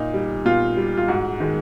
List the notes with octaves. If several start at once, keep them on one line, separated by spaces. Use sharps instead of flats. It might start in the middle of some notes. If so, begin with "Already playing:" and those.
Already playing: A#2 D#4
G3
A#2 F4
G3
F4
G#2 F#4
D#3 G#3